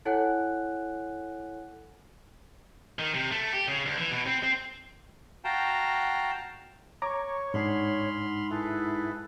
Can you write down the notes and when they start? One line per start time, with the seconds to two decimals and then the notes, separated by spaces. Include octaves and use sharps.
0.05 E4 A4 C#5 F#5 G#5 F#6
2.99 D#3
3.14 C3
3.31 A3
3.53 G4
3.68 C#3
3.86 D2
3.97 E3
4.11 B2
4.26 C4
4.43 C4
5.44 F#4 F5 G5 A5 A#5
7.02 C#5 A#5 C#6 D6
7.54 G#2 G#3 D4 D#4 F#5 B5 C6 F6
8.51 E4 G#4 A4 B4